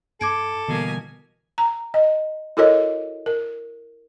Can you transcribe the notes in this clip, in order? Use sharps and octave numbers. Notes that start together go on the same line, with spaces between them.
G2 A4 D6 G#6 D7
B2 D3 E3 G3 A#3 G#5
A#5
D#5
E4 F#4 A4 A#4 C#5 D#5
A#4